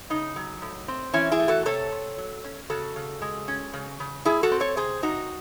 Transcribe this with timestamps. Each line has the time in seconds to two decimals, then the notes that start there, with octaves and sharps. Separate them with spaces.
0.10 C#3 D#4
0.36 F#3
0.62 A2
0.88 C4
1.14 E3 C#4 E4
1.32 E4 G#4
1.39 A3
1.48 F#4 A4
1.66 C3 A4 C#5
1.92 C3
2.18 F#3
2.44 C#4
2.70 C#3 F#4 A4
2.96 C#3
3.22 G#3
3.48 C#4
3.73 C#3
4.00 C#3
4.25 G#3 E4 G#4
4.43 F#4 A4
4.51 C4
4.60 A4 C#5
4.77 C3 G#4 C5
5.03 C3 D#4 F#4